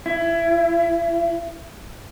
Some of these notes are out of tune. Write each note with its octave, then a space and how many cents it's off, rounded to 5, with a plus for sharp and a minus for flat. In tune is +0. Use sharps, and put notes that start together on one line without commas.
E4 +25